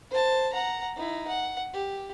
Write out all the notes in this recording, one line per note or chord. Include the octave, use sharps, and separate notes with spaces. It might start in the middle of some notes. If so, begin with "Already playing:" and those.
C5 A5
F#5 A#5
D#4 E4
F#5
G4